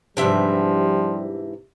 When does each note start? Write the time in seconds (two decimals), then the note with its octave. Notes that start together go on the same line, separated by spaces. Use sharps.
0.17 G#2 C3 E3 F3 G3 D4 E5